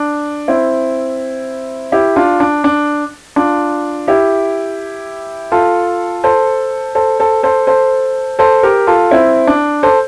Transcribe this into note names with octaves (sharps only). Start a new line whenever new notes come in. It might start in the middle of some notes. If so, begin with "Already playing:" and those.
Already playing: D4
C4 E4
E4 G4
D4 F4
D4
D4
D4 F4
E4 G4
F4 A4
A4 C5
A4 C5
A4 C5
A4 C5
A4 C5
A4 C5
G4 A#4
F4 A4
C4 E4
D4
A4 C5